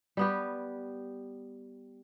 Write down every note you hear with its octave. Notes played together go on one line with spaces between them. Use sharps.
G3 B3 G4